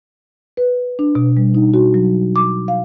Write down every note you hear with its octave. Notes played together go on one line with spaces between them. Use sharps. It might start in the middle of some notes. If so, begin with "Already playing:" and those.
B4
D4
B2
G3
D#4
F#4
F#3
D6
F5